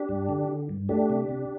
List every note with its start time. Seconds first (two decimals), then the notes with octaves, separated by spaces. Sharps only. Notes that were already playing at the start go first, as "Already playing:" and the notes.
Already playing: D4 G4
0.09 G2
0.29 D3
0.49 D3
0.69 G2
0.89 A3 D4 G4
1.10 C3
1.29 C3